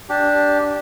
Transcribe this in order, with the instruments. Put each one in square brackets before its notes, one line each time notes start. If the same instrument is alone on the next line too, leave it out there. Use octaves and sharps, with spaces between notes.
[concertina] D4 G4